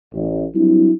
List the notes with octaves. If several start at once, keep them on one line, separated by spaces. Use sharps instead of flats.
A1
F#3 G3 C4 D4 E4